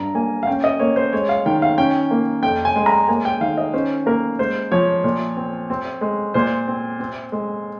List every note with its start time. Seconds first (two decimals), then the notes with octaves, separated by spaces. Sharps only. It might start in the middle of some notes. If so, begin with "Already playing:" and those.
Already playing: G2 A#5
0.15 A#3 G#5
0.43 F5
0.47 C#4 G5
0.64 D#5
0.79 A#3 C#5
0.96 C5
1.13 G#3 C#5
1.29 F5
1.46 D#3 G5
1.62 F5
1.78 C#4 G5
2.11 A#3
2.43 F2 G5
2.65 G#5
2.76 G#3
2.86 A#5
3.08 A#3 G#5
3.25 G5
3.41 D#3 F5
3.57 D#5
3.73 C#4 C5
4.06 A#3 A#4
4.39 G#3 C5
4.72 F3 C#5
5.04 A#2
5.37 C4
5.70 C4
6.01 G#3
6.34 A#2 C5
6.68 C4
7.00 C4
7.32 G#3